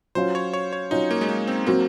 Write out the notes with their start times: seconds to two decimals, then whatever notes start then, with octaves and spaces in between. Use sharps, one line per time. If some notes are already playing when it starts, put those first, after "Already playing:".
0.15 F#3 C#4 F4 C5
0.35 C#5
0.53 C#5
0.73 C#5
0.91 F#3 C#4 D#4 F4
1.11 A#3
1.21 G#3
1.29 A#3
1.48 C4
1.67 F#3 A#3 C4 F#4